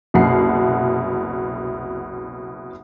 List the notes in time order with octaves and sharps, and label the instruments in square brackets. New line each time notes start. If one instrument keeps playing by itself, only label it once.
[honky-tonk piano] F#1 C2 B2 F#5 C7